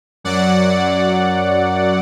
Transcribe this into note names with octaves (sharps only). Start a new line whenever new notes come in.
F#2 F#3 D5 F#5